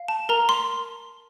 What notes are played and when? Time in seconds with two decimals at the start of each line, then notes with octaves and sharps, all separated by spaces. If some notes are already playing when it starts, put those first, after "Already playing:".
Already playing: F5
0.08 A5
0.29 A#4 A#5
0.49 C6